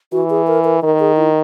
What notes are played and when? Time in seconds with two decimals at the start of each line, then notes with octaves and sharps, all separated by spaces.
0.12 E3 F#4
0.30 G#4
0.47 A#4
0.65 A#4
0.82 D#3 A#4
1.00 G#4
1.17 E4